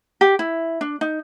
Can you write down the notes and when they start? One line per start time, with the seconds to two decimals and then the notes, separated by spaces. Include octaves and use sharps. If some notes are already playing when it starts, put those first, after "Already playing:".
0.21 G4
0.39 E4
0.81 D4
1.01 D#4